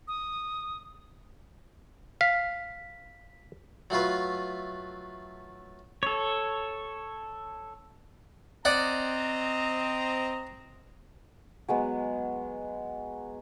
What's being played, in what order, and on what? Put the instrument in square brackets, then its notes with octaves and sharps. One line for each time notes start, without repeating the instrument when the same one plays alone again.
[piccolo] D#6
[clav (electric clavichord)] F5 [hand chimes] B6
[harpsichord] F#3 A3 F4 B4
[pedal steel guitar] A4 C#5
[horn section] C4 D#5 A#5 [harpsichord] D5 F#5
[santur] F#3 G#3 B3